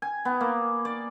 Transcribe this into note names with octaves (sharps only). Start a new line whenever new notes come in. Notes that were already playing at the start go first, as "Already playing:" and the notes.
G#5
B3
A#3
D5